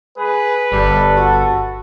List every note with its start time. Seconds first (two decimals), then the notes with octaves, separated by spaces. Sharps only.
0.17 G#4 B4
0.72 G1 G3 A4
1.16 F#4